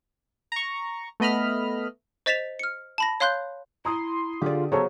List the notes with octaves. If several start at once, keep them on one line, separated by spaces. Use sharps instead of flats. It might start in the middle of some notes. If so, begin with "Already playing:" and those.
A#5 C#6
A3 B3 D#5 B5 F6
C5 D#5 A6 B6 E7 F7
F6 C#7
A5 B5 A#6
C#5 F5 C6 F#6 G6
E4 A#5 C6 D#6
D3 F4 G4 G#4 D5
C#3 F#3 B3 A4 C5 A#5 C#6